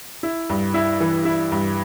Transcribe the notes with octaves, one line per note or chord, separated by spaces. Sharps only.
E4
G2
E4
E3
E4
G2